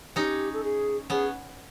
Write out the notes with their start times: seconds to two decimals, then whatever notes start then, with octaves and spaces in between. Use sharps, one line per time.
0.16 C#4 D#4 G4
0.53 A4
0.63 G#4
1.10 B3 C#4 G#4